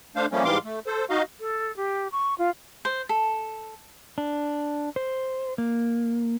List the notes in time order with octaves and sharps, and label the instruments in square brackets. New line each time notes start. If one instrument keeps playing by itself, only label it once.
[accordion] A3 D4 C5 F5
F3 G3 A3 A#3 C#4
G#2 E3 G3 F5 C6 D6
A3
A4 C5
D#4 F#4 D#5 F5
[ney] A4
G4
C#6
F4
[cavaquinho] C5
A4
[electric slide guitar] D4
C5
A#3